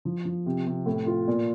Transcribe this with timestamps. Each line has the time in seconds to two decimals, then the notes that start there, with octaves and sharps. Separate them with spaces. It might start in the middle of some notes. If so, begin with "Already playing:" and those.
0.05 F3
0.25 F3
0.46 C3
0.66 C3
0.86 A2
1.06 F4
1.28 A#2